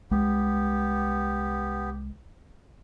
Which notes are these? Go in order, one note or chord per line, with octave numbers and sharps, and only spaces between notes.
C2 G#3 B3 G4